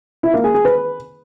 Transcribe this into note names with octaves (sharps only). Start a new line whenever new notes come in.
E4
A#3
G#4
G#4
B4